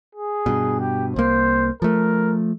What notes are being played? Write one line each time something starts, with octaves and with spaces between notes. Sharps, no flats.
G#4
G2 B2
G4
C2 A#3 C5
F3 A3 A#4